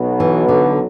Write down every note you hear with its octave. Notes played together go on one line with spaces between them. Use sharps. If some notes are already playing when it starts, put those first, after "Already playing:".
Already playing: B1 B2 F#3 B3
E3
D3